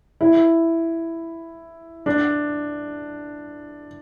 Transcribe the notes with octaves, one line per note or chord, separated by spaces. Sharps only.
E4
D4